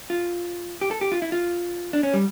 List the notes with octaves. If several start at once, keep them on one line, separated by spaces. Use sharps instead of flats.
F4
G4
A4
G4
F4
E4
F4
D4
C#4
G3